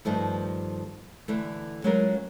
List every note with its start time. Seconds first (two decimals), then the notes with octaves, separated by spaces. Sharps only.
0.05 G2 D#3 F3 A3
1.28 D3 E3 A3
1.84 F#3 G#3 A3 C#4 F4 A#4